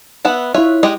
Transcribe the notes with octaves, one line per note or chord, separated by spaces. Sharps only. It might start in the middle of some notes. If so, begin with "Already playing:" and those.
B3 E5 F#5
E4 F4 C#5 E5 F#6
G#3 G4 D#5